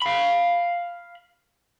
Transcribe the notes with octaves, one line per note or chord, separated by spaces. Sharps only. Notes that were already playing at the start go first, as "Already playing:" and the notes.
F5 B5